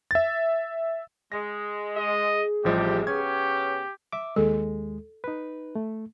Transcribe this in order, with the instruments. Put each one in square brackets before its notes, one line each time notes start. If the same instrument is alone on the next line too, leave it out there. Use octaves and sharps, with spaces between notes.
[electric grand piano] E5 A6
[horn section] G#3 [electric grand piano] A#6
[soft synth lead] G#4 [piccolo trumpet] D#5
[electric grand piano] A1 F3 G3 [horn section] C3 G#3 [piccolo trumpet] G4
[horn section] C#3 B3 C#4 [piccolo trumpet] G4 [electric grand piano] G#6
[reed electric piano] E5 D6
[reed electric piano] D#2 G#3 [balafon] A4
[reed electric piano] D#4 B4
A3